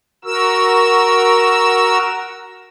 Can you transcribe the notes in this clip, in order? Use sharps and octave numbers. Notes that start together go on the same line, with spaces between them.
F#4 A#4 E6